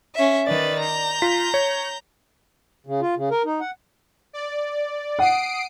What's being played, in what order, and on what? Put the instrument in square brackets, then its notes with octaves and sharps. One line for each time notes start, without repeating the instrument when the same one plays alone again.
[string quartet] C#4 E5
[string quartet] D#3 B4 A6 [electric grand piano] D5
[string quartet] A#5 G6
[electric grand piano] F4 B6
C#5
[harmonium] C#3
F4
C#3
A#4
D#4
F#5
[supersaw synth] D5
[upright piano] F#5 [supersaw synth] D#6 C7 D7